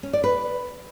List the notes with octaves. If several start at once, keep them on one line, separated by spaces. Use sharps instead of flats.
C#4
D5
B4